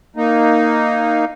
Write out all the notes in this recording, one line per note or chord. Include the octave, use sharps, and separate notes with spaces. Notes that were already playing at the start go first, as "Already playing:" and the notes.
A#3 D#4